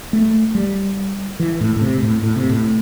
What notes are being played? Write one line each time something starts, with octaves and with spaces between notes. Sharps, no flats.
A3
G3
E3
A2
A2
C3
A2
A2
C3
A2